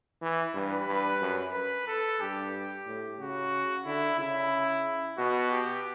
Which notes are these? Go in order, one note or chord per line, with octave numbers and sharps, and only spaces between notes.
E3
G2 B4
G2
F#2
B4
A4
G2 G4
A2
C#3 F#4
D3 E4
C#3 E4
B2 F#4
G4